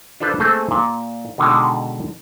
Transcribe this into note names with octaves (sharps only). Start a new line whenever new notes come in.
D4 F4 A4 B4 C5
A3 A#3 C4 G#4 A4 C5
A#2
B2 D3 D#3 G#3